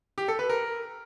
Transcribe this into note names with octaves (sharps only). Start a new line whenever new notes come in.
G4
A4
B4
A#4